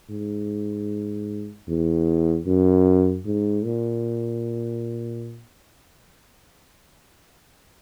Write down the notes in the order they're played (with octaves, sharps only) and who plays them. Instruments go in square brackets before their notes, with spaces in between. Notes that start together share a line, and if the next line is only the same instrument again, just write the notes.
[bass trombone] G#2
E2
F#2
G#2
A#2